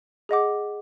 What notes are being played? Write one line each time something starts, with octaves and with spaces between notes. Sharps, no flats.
G#4 D#5 F#5 D6